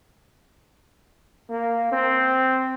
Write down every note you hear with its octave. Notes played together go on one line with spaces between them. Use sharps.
A#3
C4